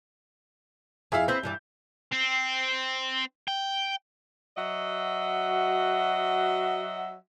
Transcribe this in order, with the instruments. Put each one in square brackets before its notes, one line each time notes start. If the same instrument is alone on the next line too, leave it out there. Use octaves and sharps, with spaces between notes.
[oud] F2 E4 [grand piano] G#4 E5 F5
[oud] C4 E4 B4 [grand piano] G6
[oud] G2 E3 D5
[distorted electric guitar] C4
G5
[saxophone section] F#3 F#4 D#5 E5 F#5